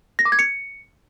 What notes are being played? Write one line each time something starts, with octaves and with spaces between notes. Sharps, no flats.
A#6
D6
G#6
C#7